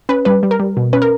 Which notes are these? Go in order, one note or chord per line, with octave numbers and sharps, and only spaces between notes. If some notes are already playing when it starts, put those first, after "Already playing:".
C#4 B4
G3 B4
G3
A#4
G3
B2
C#4 B4
A#4